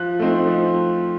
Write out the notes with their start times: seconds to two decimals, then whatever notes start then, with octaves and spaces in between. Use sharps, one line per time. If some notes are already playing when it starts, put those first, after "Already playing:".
Already playing: F3 F#6
0.19 A3 C4 D#4
0.47 F3